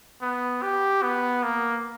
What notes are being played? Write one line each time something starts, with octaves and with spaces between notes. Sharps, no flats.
B3
G4
B3
A#3